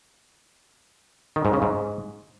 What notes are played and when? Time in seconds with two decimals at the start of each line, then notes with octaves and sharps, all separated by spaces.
1.36 D#3
1.45 G#2
1.53 C#3
1.62 G#2